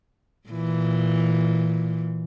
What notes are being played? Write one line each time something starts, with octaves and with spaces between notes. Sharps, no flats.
A#2 E3